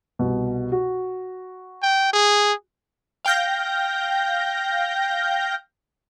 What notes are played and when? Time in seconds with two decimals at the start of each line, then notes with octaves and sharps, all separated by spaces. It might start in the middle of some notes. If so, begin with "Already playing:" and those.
0.19 C2 B2
0.72 F#4
1.82 G5
2.13 G#4
3.25 F5 G5 F6 G6 A#6